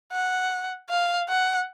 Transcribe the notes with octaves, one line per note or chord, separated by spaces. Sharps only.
F#5
F5
F#5